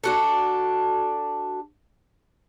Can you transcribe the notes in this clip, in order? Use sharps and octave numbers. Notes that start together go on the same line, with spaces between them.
D4 F#4 A4